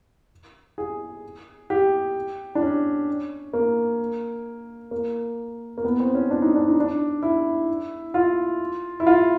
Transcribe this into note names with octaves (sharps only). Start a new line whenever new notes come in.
G#4
G4
D4
C#4
A#3
A#3
A#3
B3
C4
C#4
D4
D#4
D4
D#4
D4
E4
F4
E4
F4